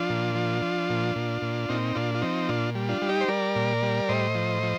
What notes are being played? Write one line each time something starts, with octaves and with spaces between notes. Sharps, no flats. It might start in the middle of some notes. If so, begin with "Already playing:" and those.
Already playing: F3 D4 F4
A#2
F3
F3
A#2
A#2
A#2
A#2 C4 D#4
A#2 D4 F4
F4
F3 C4 D#4
A#2 D4 F4
G3
D4 F4
G3
D#4 G4
C5
G3 A#4 D5
A#2
G3
A2 C5 D#5
F3
F3